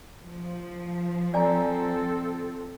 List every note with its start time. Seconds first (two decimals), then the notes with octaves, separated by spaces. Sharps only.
0.22 F3
1.34 C4 A4 D5 G#5 A#5